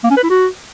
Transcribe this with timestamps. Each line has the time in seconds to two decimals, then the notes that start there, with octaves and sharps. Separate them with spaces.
0.04 A#3
0.10 C#4
0.17 B4
0.23 E4
0.30 F#4